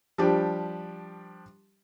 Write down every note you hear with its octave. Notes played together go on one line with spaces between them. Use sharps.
F3 G3 D4 G4